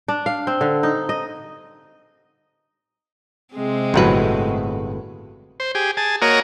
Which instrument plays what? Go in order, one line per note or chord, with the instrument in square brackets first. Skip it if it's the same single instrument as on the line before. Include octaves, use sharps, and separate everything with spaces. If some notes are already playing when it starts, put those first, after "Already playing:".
[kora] D4
F5
C4
D3
D#4
D#5
[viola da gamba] C3 G#3 C4
[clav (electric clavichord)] G1 A2 B4 [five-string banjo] F#3 A3 F#4
[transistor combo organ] C5
G4 G#4
G#4 A5
A#3 F#4 A#4 C#5 D#5